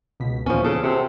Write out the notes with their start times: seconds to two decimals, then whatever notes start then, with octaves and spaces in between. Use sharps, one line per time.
0.20 C#2 B2 B6
0.46 D#2 A#2 E3 F3 C#4
0.64 C#3 A4
0.83 C3 C4 F#4